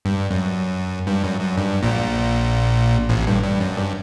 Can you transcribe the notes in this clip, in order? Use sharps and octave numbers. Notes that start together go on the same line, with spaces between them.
G2
F#2
G2
F#2
F#2
G2
A#1 A#2
A1 A2
G2
G2
F#2
G2